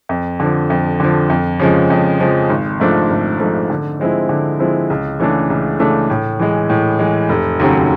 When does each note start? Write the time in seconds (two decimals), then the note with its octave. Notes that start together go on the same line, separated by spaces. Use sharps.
0.09 F2
0.40 D3 F3
0.70 F2
1.00 D3 F3
1.30 F2
1.60 C#3 F3 G#3
1.90 F2
2.20 C#3 F3 G#3
2.50 G#1
2.80 G#2 F3 A3 D4
3.10 G#1
3.39 G#2 F3 A3 D4
3.70 D3
3.99 F3 G#3 C4 E4
4.29 D3
4.60 F3 G#3 C4 E4
4.90 C#2
5.20 C#3 E3 A3 D4
5.50 C#2
5.79 C#3 E3 A3 D4
6.10 A2
6.39 E3 G#3
6.70 A2
6.99 E3 G#3
7.29 F1
7.60 D#2 C#3 F#3